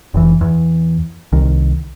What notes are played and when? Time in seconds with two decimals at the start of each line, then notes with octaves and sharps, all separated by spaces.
0.14 F1 E3
0.41 E2
1.32 C2 D#3